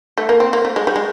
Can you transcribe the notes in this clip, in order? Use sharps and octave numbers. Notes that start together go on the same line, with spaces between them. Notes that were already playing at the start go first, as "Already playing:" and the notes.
A3
A#3
C4
A#3
A3
G#3
G3
G#3